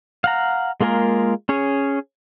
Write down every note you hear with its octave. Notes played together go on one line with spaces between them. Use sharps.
F5 F#5 A#5
G#3 A#3 F4 G#4 A#4
C#4 G#4 C#5